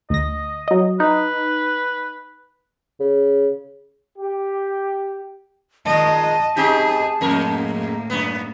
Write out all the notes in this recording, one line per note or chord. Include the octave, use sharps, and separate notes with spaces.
D2 D#5 A#6
F#3 D#5
D#4 B4
C#3
G4
A#2 D#3 G#3 D#5 A5
C4 D#4 G4 G#4
F2 A2 G#3 A#3 A#4
F#2 B3